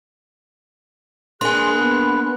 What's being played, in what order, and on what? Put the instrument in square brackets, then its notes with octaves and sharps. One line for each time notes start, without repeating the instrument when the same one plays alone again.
[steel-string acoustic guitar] A#3 D4 B4 [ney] G#4 [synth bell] G#5 C6 [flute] F#6
[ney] B3